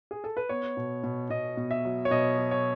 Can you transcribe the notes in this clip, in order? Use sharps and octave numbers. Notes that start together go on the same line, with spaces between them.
G#4
A4
B4
B3 C#5
B2
B2
B2 D#5
B2
E5
F#3
C#5
B2 D#5
F#3
C#5